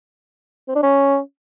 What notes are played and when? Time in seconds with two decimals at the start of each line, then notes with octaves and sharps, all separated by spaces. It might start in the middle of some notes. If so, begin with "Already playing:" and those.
0.68 C4
0.75 D4
0.83 C#4